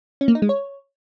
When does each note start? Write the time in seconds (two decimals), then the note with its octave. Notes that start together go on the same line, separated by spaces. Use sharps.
0.21 C#4
0.28 A#3
0.35 D#4
0.42 G#3
0.49 C#5